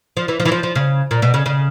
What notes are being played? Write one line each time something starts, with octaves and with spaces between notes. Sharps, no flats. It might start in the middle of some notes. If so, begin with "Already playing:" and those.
F3
E3
F3
E3
F3
F3
C#3
A#2
B2
C#3
C#3